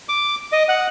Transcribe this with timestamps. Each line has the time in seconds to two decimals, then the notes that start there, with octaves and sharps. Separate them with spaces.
0.09 D6
0.52 D#5
0.69 F#5